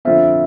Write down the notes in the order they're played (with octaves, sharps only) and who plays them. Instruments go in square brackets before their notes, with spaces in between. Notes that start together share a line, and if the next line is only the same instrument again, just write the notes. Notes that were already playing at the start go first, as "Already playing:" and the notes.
[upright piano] F2 D3 A3 C4 F4 [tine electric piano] E5